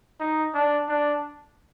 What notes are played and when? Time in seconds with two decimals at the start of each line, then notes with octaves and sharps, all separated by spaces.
0.20 D#4
0.54 D4
0.89 D4